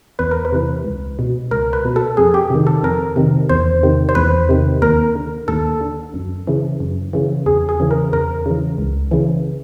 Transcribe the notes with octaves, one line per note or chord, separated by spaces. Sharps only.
E2 B4
A#4
B4
C3 E3
C#2
B2
C#2 A#4
B4
B2
A4
F2 G#4
G4
C3 D#3
A4
F2 A#4
C3 D#3
E2 C5
C3 D#3
C5
E2 B4
C3 D#3
D#2 A#4
D3
D#2 A4
D3
F#2
C#3 E3
F#2
C#3 E3
E2 G#4
G#4
C#3 E3
A#4
E2 A#4
C#3 E3
C#2
C#3 E3